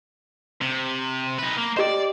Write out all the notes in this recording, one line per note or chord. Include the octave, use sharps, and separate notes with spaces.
C3
D#4 B4
A#3
G4 C5 D5 D#5